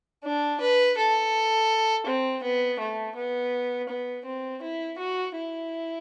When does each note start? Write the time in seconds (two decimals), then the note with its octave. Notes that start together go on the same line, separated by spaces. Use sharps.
0.24 D4
0.61 B4
0.97 A4
2.07 C4
2.43 B3
2.79 A3
3.16 B3
3.89 B3
4.25 C4
4.62 E4
4.98 F#4
5.35 E4